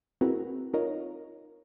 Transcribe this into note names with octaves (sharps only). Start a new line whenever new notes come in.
C4 E4 F#4 G#4 A#4 B4
D#4 F4 A#4 C#5 D#5